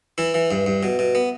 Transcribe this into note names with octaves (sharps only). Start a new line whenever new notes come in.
E3 E4
E3
G2
G2
B2
B2
B3